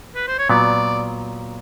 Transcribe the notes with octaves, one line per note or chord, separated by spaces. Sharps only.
B4
C5
C#5
A#2 F#3 B3 D5